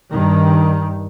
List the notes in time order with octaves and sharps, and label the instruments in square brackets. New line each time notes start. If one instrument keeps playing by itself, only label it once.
[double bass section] G2 D#3